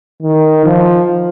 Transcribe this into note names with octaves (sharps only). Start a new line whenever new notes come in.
D#3
F3